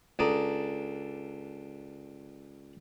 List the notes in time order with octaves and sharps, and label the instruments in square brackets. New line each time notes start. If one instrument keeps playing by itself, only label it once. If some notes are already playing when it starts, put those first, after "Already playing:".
[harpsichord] C#2 D4 A4 A#5 D#6